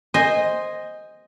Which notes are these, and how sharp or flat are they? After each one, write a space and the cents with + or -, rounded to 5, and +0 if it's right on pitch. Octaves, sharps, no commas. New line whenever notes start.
C5 +0 D#5 +0 G#5 -20